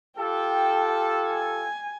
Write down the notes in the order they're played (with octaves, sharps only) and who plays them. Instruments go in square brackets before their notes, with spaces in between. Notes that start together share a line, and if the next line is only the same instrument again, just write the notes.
[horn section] F4 G4 A4 [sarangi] G5
[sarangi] G#5